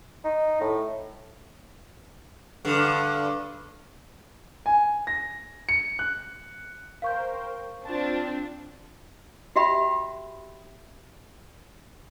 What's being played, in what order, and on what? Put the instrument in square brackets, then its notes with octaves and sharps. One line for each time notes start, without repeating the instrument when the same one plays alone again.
[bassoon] D#4
A2
[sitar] G2 D3
[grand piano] G#5
A#6
C#7
F#6
[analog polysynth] A#4 C5 G5 [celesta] F5 C#6 G6
[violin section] C4 D4 [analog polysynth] F4 A5
[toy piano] F#4 G4 E5 G5 B5